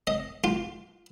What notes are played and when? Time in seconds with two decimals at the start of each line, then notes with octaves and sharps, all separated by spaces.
0.07 D#5
0.44 F4